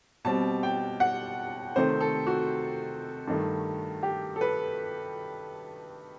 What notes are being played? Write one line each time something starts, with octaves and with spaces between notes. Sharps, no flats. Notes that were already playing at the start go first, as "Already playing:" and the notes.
B2 G3 C4 A5
G5
F#5
C3 D#3 A3 C4 C5
A4
F#4
G2 D#3 A3
G4
A4
B4